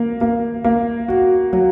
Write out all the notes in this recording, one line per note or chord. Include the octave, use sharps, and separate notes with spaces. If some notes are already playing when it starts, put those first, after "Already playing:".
Already playing: A#3
A#3
A#3
F#4
F#3